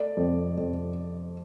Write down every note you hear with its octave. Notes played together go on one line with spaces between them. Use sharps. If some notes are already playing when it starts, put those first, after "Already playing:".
Already playing: A3 D5
F2
F2